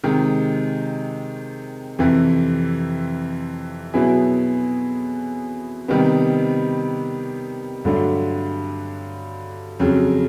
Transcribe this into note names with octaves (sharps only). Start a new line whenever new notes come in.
C3 D#3 G#3
F2 C3 E3
B2 F#3 B3 E4 G#4
C3 D#3 G3 B3
G2 D3 F#3 A3 D4
F2 C#3 F#3